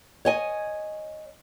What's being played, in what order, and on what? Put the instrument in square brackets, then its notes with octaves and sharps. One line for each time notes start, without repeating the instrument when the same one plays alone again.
[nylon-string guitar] C#5 D#5 G#5